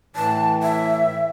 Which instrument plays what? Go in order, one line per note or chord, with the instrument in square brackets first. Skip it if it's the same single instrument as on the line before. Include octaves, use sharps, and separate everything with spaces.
[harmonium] A2 E3 [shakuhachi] A5
[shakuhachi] E5